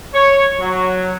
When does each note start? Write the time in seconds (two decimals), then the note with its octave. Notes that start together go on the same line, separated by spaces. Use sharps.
0.14 C#5
0.59 F#3